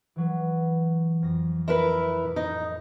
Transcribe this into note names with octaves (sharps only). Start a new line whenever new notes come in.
E3 F#3 B4
F2 A#6
E4 A#4 B4
A2
D#4